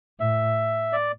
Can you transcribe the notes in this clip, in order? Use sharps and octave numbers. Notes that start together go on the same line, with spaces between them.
A2 E5
D5